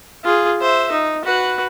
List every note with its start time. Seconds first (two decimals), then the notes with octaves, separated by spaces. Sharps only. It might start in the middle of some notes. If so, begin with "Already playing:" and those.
0.24 F4 G#4
0.61 C5 E5
0.92 D#4
1.25 F#4 B4